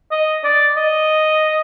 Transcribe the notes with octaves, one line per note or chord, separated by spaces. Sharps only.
D#5
D5
D#5